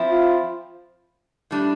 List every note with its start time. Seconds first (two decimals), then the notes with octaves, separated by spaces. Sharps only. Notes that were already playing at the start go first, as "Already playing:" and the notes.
Already playing: F3 C4 E4
0.10 F4
1.51 A2 G3 D4